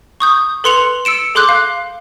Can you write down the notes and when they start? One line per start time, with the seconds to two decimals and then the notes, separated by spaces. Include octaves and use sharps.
0.20 C#6 D#6 G6
0.64 A4 B4 C6 C#7 F7 F#7
1.05 E6 C#7 D7 E7
1.35 G#4 A4 C6 D6 F#6 G6
1.49 F5